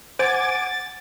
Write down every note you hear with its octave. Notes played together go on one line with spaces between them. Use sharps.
C5 F#5 G#5 D6 A6